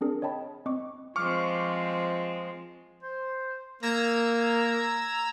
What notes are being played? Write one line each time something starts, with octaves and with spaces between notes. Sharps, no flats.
C4 D4 G#4 A#4
C#5 D#5 G5 A5 B5
C4 D#5 C#6 D6
F3 G#3 C4 C#6 D6 F6
C5
A#3 A#5 E6 G#6